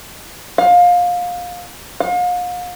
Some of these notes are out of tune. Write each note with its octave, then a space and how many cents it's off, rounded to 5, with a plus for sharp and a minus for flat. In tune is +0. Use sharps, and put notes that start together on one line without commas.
F5 +25
F5 +40